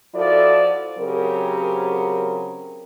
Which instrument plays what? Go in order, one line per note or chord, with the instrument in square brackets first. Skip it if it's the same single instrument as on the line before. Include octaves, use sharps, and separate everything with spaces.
[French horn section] F3 E4 F#4 A4 D5
C#3 F#3 C4 G4 A#4